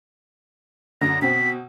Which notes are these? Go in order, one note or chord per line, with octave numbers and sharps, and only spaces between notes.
F#2 D3 A#6
B2 C4 B6